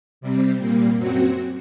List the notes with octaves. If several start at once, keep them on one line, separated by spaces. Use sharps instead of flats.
C3 G3 C4
A#2 G3 A#3
F#2 F#3 C4 F#4